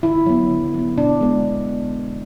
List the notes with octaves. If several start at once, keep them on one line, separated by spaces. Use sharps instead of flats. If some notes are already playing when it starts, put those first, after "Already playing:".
D3 E4
F#3 B3
D3
F#3 B3
B2 D4
G#3 B3